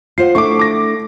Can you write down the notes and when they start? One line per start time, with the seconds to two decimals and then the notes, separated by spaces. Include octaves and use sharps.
0.18 F4 C5 F#5 C7
0.35 A3 D4 E4 C#6 D6
0.59 D6 A#6